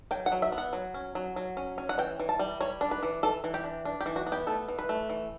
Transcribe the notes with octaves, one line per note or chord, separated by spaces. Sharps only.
F#3 G5
F#5
F#3
E5
B3
F#5
F#3
C#4
F#3
F#3
C#4
C#4
F#5
E3 G5
E3
A5
G3
G3 C#5
D4
B4
E3
E3 A4
E3
G4
D4
D4
G4
E3
F#4
B3
G4
A3 A4
E3
B4
A3
E3